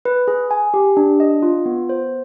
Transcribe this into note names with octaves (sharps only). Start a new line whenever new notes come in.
B4
G#4
G#5
G4
D4
D#5
F4
B3
C5